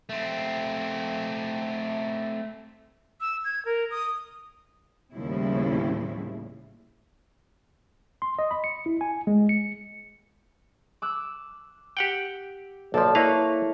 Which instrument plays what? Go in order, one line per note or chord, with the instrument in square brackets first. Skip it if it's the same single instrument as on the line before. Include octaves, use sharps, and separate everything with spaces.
[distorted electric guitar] A3 C4
[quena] E6
G#6
A#4
D#6
[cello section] D#2 A2 C#3 F3 G3 E4
[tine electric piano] C6
D#5
B5
C#7
E4
G#5
G#3
C#7
[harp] D6 E6 F#6
[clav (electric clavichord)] G4 F#5 G5
[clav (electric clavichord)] B1 F3 [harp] A#3 A4 D5
[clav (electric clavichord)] A#3 B4 F5 [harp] E4 C#5